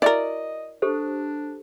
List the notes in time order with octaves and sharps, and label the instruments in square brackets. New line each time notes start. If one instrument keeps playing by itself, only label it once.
[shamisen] E4 F#4 A#4 [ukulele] D5 [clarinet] D#5
[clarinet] D4 [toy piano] G4 A4 C5